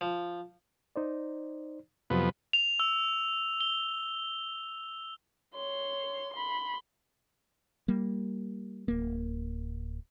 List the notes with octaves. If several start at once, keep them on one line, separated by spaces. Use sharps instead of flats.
F3
D#4 C5 D5
F2 C3 F#3 B3 G4
F7
E6
G7
C#5 C6
B5 C6
G3 A#3
D1 A#3